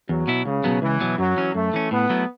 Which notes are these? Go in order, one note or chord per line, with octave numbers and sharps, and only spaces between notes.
E2 F#3
B2 B3 E4
C#2 C#3
B2 F#3 B3
C#2 E3
B2 F#3 B3
F#2 F#3
E3 C#4
F#2 A3
E3 C#4
A2 B3
F#3 A3 E4